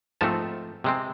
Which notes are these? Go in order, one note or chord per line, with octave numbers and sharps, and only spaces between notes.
G#2 F3 A3 C4 A5
C3 G#3 C4